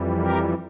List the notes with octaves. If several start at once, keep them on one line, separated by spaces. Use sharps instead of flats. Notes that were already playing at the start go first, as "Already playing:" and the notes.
Already playing: F2 E3 G3
G4 A#4